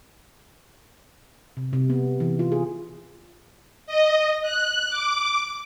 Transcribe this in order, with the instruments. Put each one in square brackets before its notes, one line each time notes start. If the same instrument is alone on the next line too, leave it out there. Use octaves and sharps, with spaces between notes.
[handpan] C3
C3
B3
E3
F4
G#4
[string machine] D#5
F#6
D6